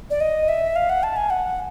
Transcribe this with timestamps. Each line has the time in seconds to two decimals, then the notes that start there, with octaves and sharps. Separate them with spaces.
0.10 D5
0.21 D#5
0.48 E5
0.76 F5
0.90 F#5
1.03 A5
1.16 G#5
1.30 F#5